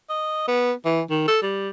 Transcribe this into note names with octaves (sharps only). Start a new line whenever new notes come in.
D#5
B3
E3
D#3
A4
G3